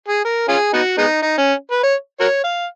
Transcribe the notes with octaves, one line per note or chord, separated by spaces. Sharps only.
G#4
A#4
C#4 F4 G#4
B3 D#4 F#4
G#3 B3 D#4
D#4
C#4
B4
C#5
F#4 A#4 C#5
F5